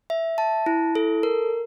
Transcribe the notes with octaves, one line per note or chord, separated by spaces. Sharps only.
E5
A5
E4
A4
A#4